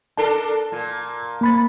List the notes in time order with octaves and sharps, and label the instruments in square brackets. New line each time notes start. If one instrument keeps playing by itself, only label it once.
[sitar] D4 A4 A#4 [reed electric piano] A5
[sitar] A#2
[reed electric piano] A#3 B5 A6